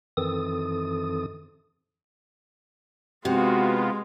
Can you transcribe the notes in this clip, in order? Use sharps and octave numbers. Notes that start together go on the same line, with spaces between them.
F#2 D#3 E3 C4 A4 D#6
C3 G#3 B3 F4 F#4